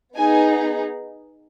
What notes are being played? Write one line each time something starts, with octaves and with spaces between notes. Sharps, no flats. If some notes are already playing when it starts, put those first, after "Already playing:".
B3 D#4 G#4 G#5